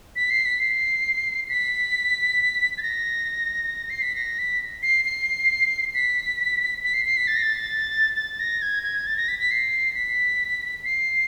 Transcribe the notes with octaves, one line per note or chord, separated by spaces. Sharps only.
B6
C7
B6
C7
B6
A6
A#6
C7
B6
A#6
B6
C7
C7
B6
B6
C7
C7
B6
A6
A#6
A6
A6
A#6
G#6
G#6
A6
A#6
B6
B6
C7
B6
C7